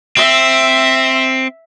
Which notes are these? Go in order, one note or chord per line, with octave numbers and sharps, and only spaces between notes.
C4 E5